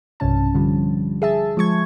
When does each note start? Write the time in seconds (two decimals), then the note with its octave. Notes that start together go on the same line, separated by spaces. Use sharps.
0.20 B1 G2 C3 C#4 A5
0.55 D3 F3 G3
1.22 G#4 E5 A5
1.57 F3 G#3 C#6 G#6